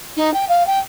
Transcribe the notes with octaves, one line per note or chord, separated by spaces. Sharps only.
D#4
G5
F5
G5